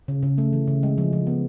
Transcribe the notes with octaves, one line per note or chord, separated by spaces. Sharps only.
C#3
C#3
A3
E3
C#3
G#3
F3
F3
B3